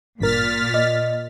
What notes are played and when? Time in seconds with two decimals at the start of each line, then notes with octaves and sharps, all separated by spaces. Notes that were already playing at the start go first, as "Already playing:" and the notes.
0.20 G#1 G2 A#2 A#4 F6 A6 B6
0.74 D5 D#5